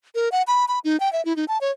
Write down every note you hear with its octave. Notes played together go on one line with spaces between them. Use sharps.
A#4
F#5
B5
B5
D#4
G5
E5
E4
D#4
A5
C#5